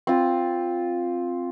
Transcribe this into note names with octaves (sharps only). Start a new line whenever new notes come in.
C4 F4